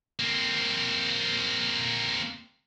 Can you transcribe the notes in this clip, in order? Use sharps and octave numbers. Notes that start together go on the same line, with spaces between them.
A#3 C4